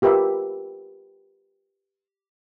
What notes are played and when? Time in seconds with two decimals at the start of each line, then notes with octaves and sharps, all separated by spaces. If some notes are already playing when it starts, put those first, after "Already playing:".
0.02 F4 G4 A#4 B4 E5